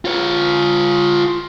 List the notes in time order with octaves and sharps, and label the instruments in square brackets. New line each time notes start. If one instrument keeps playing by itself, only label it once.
[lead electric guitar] F4 C#5